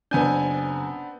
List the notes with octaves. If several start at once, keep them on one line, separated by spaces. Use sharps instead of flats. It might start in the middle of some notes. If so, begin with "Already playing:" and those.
F#1 B3 C4 D4 G#5 G6